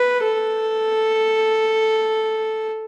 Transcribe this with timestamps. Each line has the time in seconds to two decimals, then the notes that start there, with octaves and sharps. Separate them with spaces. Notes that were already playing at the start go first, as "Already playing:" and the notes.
Already playing: B4
0.24 A4